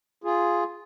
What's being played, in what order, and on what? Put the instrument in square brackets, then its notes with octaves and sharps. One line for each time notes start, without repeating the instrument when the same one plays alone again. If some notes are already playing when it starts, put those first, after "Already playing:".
[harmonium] F4 G#4